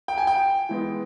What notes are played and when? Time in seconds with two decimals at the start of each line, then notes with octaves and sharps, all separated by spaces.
0.08 G5
0.18 G#5
0.27 G5
0.69 E3 G#3 B3